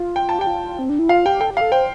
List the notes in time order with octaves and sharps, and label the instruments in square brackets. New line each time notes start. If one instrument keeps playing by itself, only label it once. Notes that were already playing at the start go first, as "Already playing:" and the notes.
Already playing: [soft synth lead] F4
[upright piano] G5
A5
[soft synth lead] G4 [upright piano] G5
[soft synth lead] F4
C4
D4
E4
[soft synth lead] F4 [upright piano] F5
[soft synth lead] G4 [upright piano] G5
[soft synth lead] A4 [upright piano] G5
[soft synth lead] G4
[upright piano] F5
[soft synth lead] A4
[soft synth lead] C5 [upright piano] G5